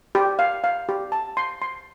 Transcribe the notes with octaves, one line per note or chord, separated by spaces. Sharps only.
G4
F5
F5
G4
A5
C6
C6